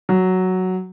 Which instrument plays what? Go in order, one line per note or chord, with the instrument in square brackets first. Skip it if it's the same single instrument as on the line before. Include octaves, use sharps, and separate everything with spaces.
[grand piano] F#3